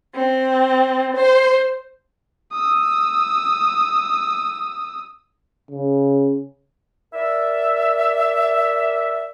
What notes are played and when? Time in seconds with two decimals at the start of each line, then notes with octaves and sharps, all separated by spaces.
0.13 C4
1.15 C5
2.52 D#6 E6
5.71 C#3
7.13 A#4 D5 E5